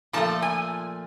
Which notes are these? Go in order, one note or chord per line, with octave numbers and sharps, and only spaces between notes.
A#2 F3 A3 A5
G#5